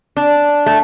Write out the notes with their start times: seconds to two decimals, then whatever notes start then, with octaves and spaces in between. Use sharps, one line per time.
0.17 D4
0.66 A3